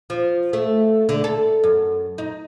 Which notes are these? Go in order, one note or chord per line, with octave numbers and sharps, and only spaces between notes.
F3
A3
D3
A4
F#2
D#4